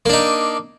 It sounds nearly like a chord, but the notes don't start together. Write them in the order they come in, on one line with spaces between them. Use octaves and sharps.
A#3 D4 D#4